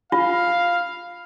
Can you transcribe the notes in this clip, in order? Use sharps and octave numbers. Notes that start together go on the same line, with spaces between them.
F4 F5